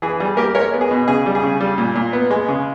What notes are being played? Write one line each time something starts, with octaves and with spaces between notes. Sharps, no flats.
E3 G#4
G3 G#4
A#3 G4 A#4
G#3 A#4 C#5
B3
G#4
B2
C#3 G#4
G3
G#4
C#3
G3
A#2
A#2
B3
G#3
C#3